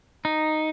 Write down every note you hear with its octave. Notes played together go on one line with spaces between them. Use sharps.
D#4